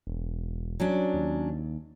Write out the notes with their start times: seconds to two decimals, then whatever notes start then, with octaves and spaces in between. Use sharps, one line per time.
0.07 E1
0.80 F#3 C#4 D4
1.13 D#2